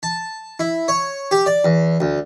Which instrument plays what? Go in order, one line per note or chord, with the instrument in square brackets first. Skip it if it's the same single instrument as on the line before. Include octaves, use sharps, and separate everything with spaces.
[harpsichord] A5
E4
C#5
G4
D5
E2
D2